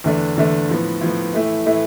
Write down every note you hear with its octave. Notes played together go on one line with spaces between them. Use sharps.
E2 D3 A3 D4
E2 D3 A3 D4
A2 F3 B3
A2 F3 B3
A2 E3 A3 E4
A2 E3 A3 E4